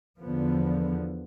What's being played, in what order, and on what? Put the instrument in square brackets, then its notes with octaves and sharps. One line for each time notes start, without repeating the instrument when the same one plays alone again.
[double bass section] E2 D3 F3 B3